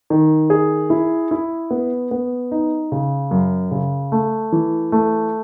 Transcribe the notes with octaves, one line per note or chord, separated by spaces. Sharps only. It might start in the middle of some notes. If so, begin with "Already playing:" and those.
D#3
G#4
E4
E4
B3
B3
D#4
C#3
F#2
C#3
A3
E3
A3